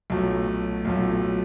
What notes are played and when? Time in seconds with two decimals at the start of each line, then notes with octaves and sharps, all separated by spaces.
0.10 B1 A#2 F#3 A3
0.85 B1 A#2 F#3 A3